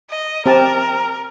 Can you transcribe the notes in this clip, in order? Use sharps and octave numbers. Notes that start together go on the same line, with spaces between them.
D#5
C4 G4 A#4 A5